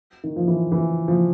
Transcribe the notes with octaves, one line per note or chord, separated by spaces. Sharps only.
D#3
F3
E3
E3
F3